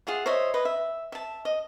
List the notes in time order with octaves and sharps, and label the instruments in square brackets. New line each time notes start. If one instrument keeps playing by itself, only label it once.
[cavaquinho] F4 G#4 E5 F#5
C5 C#5 D#5 E5
B4 D#5
E5
E5 A5
D#5